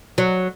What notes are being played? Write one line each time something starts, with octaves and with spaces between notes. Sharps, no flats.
F#3